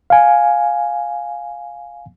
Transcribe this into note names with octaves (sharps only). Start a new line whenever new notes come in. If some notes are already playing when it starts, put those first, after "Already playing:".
F5 G#5